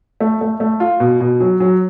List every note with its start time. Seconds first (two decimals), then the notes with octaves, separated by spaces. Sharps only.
0.20 A3
0.41 A3
0.60 A3
0.80 F4
1.00 B2
1.20 B2
1.40 F#3
1.60 F#3